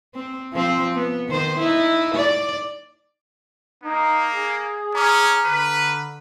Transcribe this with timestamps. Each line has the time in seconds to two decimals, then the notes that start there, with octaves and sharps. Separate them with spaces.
0.15 C4
0.53 F3 C4
0.95 B3
1.28 D#3 C5
1.59 D#4 E4
2.15 D5
3.84 A#3 D#4
4.31 G#4
4.95 C#4 A#5 D6 F6
5.45 D3 B4